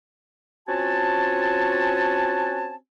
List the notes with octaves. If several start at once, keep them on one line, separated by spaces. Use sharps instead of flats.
C4 C#4 F4 F#4 G#5 A5